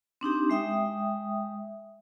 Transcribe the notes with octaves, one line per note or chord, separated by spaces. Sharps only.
C4 D4 D#4 G4
G#3 E5 G5 D#6